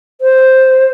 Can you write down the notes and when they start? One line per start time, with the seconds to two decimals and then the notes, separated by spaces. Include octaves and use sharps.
0.21 C5